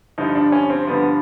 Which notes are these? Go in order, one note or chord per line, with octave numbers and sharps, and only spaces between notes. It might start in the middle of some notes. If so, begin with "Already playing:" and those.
G2 D3 F3 D#4
D4
C#4
C4
G2 D3 F3 B3